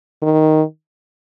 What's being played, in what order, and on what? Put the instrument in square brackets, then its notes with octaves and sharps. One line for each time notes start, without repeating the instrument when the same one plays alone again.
[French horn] D#3